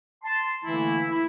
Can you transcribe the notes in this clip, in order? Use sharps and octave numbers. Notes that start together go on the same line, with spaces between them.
A5 C6
D3 E3 A3 A#3 E4
E4